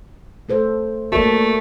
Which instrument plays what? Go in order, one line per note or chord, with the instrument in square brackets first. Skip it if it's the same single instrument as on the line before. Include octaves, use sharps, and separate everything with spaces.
[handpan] A3 A4 C5
[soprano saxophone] A3 [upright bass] A#3 D4 [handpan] F#4 A#4 D5